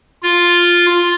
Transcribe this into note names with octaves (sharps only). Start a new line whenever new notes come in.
F4